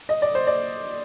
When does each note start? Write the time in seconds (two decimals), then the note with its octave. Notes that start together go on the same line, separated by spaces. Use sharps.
0.09 D#5
0.22 D5
0.35 C5
0.47 D5